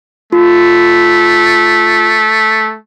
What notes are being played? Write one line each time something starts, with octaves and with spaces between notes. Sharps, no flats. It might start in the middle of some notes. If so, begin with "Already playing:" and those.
A3 F4